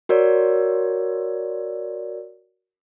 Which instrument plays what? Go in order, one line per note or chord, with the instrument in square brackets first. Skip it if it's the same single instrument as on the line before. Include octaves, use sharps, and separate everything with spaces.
[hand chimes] F#4 A#4 C#5 D5